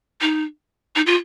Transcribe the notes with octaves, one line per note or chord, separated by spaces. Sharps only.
D#4
D#4
F4